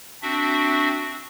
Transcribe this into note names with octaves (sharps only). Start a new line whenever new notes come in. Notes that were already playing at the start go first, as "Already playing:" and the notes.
C4 D4 F#4 E5